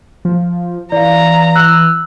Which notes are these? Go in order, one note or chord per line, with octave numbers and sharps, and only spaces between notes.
F3
E3 D5 F5 A#5
E6 F#6 F#7